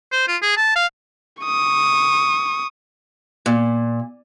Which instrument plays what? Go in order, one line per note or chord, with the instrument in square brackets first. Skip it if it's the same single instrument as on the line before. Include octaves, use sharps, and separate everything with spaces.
[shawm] C5
F4
G#4
A5
F5
[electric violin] C#6 D#6
[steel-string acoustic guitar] A#2